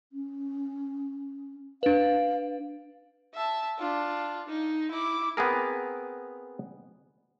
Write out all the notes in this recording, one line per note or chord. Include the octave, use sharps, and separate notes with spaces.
C#4
D4 B4 F5
E5 A5
D4 F4
D#4
E4 D6
B3 C4 G#4 A#4